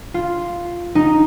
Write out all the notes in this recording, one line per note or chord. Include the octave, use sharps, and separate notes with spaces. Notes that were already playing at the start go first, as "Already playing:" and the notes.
F4
D#4